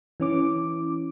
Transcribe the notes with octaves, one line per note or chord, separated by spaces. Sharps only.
E3 C#4 D6